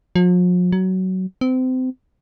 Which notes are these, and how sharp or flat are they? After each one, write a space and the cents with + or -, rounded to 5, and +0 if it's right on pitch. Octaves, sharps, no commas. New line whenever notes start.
F3 +45
F#3 +15
C4 -30